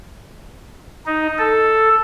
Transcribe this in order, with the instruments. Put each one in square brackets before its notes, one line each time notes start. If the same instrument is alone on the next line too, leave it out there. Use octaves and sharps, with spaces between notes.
[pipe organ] D#4
A4